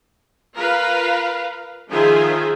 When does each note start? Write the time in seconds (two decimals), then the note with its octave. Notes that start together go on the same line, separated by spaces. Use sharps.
0.54 F4 A#4 B4 F5
1.89 D#3 F3 F4 G#4 C5 E5